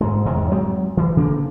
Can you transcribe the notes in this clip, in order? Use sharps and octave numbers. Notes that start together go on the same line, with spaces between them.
G#2 G#3
E2 G#2 C3
F#3 G#3 C4
E3
C#3 A#3 C4 D4